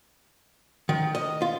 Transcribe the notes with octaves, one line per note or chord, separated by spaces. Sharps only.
D#3
D#5
F4